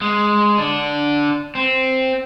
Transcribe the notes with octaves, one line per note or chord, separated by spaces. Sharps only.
G#3
D3 D4
C4